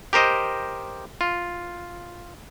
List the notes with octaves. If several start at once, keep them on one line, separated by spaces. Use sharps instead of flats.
G4 A#4 C5 D#5
F4